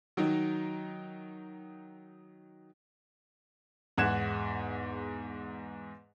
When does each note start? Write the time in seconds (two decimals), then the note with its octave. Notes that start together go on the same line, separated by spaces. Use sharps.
0.17 D#3 F#3 D#4
3.98 E2 G#2 F#5 F#6 G#6 E7